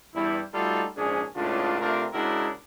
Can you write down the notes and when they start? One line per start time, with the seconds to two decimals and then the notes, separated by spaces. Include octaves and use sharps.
0.15 E2 G2 G3 E4
0.54 G3 A3 D#4 F4 F#4 A4
0.97 A#1 G#2 C#4 D4 G#4
1.36 C#2 A2 C#3 D4 F4
1.80 C3 A3 C4 D4 F4 A#4
2.13 C#3 G#3 D4 E4 F#4 A#4